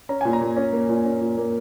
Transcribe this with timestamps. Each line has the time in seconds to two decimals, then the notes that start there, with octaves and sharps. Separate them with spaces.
0.09 C#4 A#5
0.21 A#2 G#5
0.33 A#5
0.41 A#2
0.56 C#4
0.73 A#3
0.89 A#2
1.05 C#4
1.21 A#2
1.38 A#3